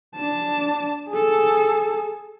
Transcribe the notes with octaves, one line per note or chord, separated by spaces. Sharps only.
D4 A5
G#4 A4